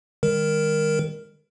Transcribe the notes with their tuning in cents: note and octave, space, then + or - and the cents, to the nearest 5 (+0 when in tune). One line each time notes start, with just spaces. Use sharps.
D#3 +0 G#3 -45 A#4 +0